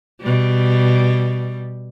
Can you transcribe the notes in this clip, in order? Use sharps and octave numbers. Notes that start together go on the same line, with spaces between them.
B2 G3